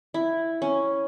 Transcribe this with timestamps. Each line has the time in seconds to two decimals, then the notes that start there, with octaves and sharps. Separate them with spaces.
0.14 E4
0.62 C#4